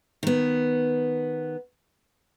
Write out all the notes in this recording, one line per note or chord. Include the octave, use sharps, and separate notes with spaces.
D#3 B3